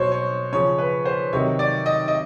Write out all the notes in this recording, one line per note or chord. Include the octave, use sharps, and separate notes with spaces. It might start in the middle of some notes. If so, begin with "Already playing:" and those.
Already playing: B2 F#3 C5 C#5
C#5
C#3 F3 C#5
B4
C5
C3 D#3 F#3 C#5
D5
D#5
D#5